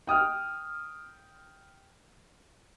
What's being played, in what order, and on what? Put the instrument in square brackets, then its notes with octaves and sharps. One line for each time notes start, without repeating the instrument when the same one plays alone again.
[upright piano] G5 D#6 F6